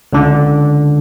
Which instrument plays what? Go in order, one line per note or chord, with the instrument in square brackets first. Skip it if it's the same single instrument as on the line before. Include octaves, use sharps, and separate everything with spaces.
[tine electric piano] C#2 D3